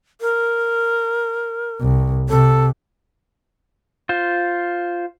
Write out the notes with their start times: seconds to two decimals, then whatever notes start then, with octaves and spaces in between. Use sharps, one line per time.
0.21 A#4
1.81 C2
2.29 C3 A4
4.09 F4 C5